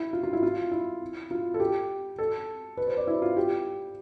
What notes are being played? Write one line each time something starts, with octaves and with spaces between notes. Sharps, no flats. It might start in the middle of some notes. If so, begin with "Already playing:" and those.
Already playing: E4
F4
F4
E4
F4
E4
F4
A4
G4
A4
B4
C5
D5
E4
F4
G4